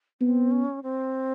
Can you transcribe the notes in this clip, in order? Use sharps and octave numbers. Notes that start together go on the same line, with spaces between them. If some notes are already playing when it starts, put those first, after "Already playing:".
B3 C4
C#4
C4